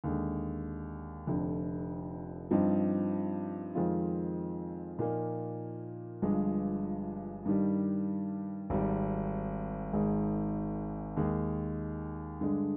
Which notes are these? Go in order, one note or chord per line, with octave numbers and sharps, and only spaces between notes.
D#2 D3 G#3
F1 F2 D3
G2 F3 C4 D#4
F2 D#3 G#3 C4 F4
A#2 F3 A#3 D#4
G1 G2 F3 G#3
G2 D#3 G3
G#1 G#2 G3
G#1 G#2 D#3 G#3
D#2 D#3 G#3
G2 D3 G#3